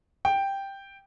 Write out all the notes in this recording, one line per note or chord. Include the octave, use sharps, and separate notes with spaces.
G5